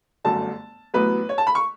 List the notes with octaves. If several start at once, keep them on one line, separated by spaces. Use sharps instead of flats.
G1 F#2 D3 F#3 A3 A5
A1 A2 F#3 B3 B4
C#5
A5
B5
C#6